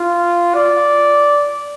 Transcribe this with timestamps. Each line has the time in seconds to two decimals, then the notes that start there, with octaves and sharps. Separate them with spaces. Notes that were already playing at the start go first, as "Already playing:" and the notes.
Already playing: F4
0.54 D5